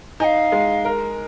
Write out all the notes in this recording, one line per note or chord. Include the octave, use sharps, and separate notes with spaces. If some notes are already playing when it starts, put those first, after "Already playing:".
D#4 F5 G#5
G#3
A#4